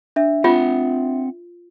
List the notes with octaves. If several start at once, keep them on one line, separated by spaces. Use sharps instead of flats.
D4 E5
C4 F4 F#5